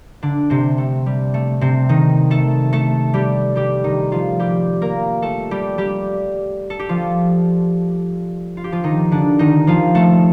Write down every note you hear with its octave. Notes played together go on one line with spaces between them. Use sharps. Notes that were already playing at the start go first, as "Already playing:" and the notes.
D3 D4
C3 C4
A3
G3
A3
C3 C4
D#3 D#4
A3 A4
A3 A4
G3 G4
G3 G4
D#3 D#4
F3 F4
G3 G4
A#3 A#4
A3 A4
G3 G4
G3 G4
A4
G4
F3 F4
F4
G4
F3 F4
D#3 D#4
D3 D4
D#3 D#4
F3 F4
A3 A4